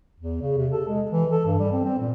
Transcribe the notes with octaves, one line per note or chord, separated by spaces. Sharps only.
E2
C#3
C3
A4
G#3
E3
A4
G2
G3
C4
C4
A#2